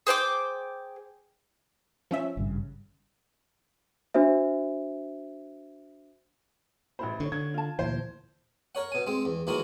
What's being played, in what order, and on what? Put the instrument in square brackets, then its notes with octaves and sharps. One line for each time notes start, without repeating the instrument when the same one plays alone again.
[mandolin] G#4 C5 G5 D6
[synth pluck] F3 C#4 E5
[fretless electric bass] G#1 G2 C#3
[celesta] D4 F#4 C5 E5
[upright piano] A1 C5 [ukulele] E4 B5
[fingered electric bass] D3 [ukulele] C#4 C#5
[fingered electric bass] D3 [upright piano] G#6
[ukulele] F4 A5
[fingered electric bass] D2 A#2 E3 [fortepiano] C5
[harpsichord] A#4 C#5 F#5
B2 G#5
G#3 C4
E2
D#2 E3 G#3 F#4 A#4